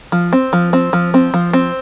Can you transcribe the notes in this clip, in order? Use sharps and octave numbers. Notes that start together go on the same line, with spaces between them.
F3
C4
F3
C4
F3
C4
F3
C4